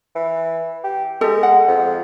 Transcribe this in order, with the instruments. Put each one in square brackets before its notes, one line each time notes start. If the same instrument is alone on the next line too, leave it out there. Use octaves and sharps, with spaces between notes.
[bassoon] E3
G4
[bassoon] G#3 [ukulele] G4 A4
[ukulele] F#5
[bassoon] F2